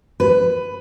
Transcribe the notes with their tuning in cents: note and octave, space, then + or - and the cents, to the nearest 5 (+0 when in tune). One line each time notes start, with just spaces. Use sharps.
B4 +15